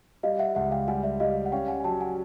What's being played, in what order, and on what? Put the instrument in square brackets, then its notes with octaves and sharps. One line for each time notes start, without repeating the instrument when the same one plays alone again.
[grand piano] G3 [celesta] D#5 F5
[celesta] E5 F#5
[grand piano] C#2 [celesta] E5 F#5
[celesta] F5 G5
[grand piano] G3 [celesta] F#5 G#5
[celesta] D5 E5
[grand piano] G3 [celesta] D#5 F5
[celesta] F#5
[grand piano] C#4 [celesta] F5 G5
[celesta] F#5 G#5
G#5
[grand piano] F#3 [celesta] G5 A5
[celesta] F#5 G#5